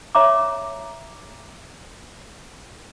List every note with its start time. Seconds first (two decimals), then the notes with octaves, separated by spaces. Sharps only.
0.15 C#5 E5 A#5 D6